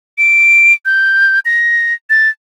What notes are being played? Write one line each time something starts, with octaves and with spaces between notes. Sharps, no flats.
D7
G6
A#6
A6